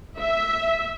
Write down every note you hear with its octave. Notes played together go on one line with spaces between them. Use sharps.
E5